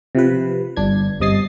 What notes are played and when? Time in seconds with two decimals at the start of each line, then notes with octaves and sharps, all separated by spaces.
0.15 C3 F3 B4
0.77 G1 D4 G#6
1.20 G1 C3 D#5 D#6 A6 C7